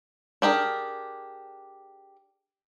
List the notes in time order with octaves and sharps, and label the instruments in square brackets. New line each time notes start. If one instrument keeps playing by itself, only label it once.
[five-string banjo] D4 G4 G#4 A#4